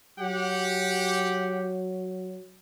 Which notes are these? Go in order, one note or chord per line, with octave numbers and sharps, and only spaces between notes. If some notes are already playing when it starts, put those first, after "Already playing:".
F#3 G4 F#5